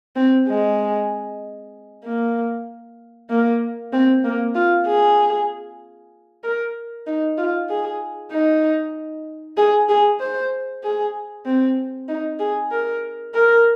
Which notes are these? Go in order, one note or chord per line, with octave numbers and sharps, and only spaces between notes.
C4
G#3
A#3
A#3
C4
A#3
F4
G#4
A#4
D#4
F4
G#4
D#4
G#4
G#4
C5
G#4
C4
D#4
G#4
A#4
A#4